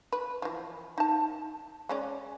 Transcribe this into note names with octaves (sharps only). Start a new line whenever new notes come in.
B4
E3 F3
D#4 A5
G#3 C#4 D5